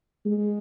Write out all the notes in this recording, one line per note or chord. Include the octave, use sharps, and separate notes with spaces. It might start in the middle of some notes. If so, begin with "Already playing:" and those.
G#3